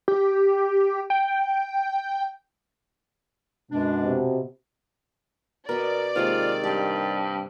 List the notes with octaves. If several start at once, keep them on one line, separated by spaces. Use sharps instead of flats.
G4
G5
F#2 B2 G#3 D4
C3
B2 A#4 D5 B5
C3 D#3 G#3 A#3 F4
G2 G4 F5